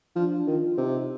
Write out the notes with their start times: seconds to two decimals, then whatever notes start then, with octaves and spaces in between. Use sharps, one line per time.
0.16 F3 D4
0.47 D#3 F4
0.77 C3 D#4